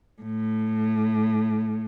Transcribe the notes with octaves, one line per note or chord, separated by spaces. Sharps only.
A2